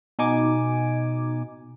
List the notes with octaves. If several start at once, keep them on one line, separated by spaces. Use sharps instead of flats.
B2 D#4 G#5 D6